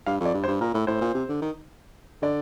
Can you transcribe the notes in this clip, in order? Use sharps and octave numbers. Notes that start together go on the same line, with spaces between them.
G2 F5
F2
D5
G2
C5
G2
A#2 A#4
A2
A2 C5
A#2
C3
D3
D#3
D3 D5